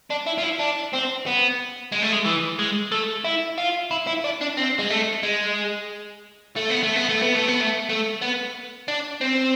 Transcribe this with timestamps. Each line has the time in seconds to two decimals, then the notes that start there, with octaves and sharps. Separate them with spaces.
0.10 D4
0.26 E4
0.38 F4
0.43 E4
0.59 D4
0.93 C4
1.26 B3
1.92 G#3
2.02 A3
2.12 G#3
2.25 E3
2.59 G#3
2.92 A3
3.24 E4
3.58 F4
3.91 E4
4.07 E4
4.24 D4
4.41 D4
4.57 C4
4.79 G#3
4.90 A3
5.23 G#3
6.56 A3
6.70 B3
6.83 A3
6.96 B3
7.09 A3
7.22 B3
7.35 A3
7.48 B3
7.61 A3
7.89 A3
8.22 B3
8.88 D4
9.21 C4